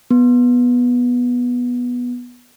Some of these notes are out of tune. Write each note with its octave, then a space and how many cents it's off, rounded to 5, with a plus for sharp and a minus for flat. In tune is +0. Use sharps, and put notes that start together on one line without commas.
B3 -10